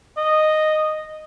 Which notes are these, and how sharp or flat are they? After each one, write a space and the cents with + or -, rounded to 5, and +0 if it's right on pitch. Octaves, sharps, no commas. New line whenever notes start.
D#5 -5